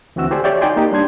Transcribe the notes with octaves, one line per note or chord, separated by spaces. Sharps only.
D2 E3 C4 F#4 E6
E4 G4 A4 C5 D5 G#5
G4 C#5 D5 E5 G5
D#4 F#4 D5 G5 G#5 C6
A#3 D#4 G4
G3 D4 C6 G#6